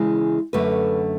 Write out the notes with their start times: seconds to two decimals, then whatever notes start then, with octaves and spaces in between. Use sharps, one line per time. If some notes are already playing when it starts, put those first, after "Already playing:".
Already playing: C#3 E3 G#3
0.53 F#2 D3 A3 B4